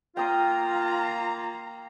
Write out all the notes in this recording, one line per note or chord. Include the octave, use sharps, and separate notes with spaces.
A#3 F4 G5 A#5 D#6